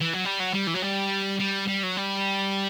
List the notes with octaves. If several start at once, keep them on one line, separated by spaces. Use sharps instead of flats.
E3
F#3
G3
F#3
G3
E3
F#3
G3
G3
G3
F#3
G3